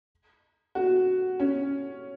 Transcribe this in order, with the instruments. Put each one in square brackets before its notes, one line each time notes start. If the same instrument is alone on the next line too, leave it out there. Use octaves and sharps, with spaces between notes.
[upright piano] F#4
C#4